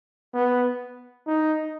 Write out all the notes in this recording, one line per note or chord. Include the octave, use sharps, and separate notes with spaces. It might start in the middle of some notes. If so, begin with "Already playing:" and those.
B3
D#4